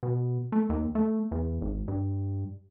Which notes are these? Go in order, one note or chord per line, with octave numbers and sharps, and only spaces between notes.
B2
A3
D#2
A3
E2
G#1
G2